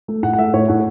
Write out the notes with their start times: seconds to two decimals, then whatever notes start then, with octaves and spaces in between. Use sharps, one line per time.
0.08 A3
0.23 A2 F#5
0.33 F#5
0.38 A3 E5
0.53 A2 C#5
0.68 A2 F#5